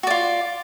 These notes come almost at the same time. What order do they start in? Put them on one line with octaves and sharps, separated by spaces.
F#4 D5 F4